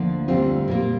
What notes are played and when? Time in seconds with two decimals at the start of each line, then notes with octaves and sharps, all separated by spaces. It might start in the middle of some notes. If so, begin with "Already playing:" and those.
Already playing: D2 D3 F3 A#3
0.28 D2 D3 G3 C4 F4
0.68 A#2 G3 A#3